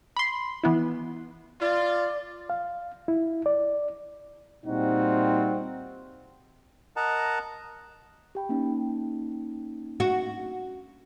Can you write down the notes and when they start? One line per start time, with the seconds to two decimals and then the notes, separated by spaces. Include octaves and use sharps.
0.16 B5 C6
0.63 E3 B3 E4
1.61 F4 D5
2.50 F5
3.08 E4
3.46 D5
4.65 A#2 G3 C4 D#4 F4 F#4
6.96 A#4 D#5 F#5 A5 A#5
8.35 G4 G5 B5
8.49 A#3 C#4 D#4
10.00 F#4